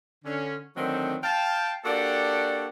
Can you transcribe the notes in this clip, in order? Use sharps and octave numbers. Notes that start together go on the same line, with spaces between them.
D3 C#4
D3 D#3 F#3 A3 C4
F5 G5 A5
A#3 D4 F#4 G4 A4 D5